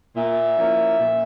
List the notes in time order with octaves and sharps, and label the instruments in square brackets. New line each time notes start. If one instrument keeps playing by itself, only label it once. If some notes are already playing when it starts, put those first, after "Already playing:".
[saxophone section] A#2 E5
F3 A#3 C#4 E4
A#2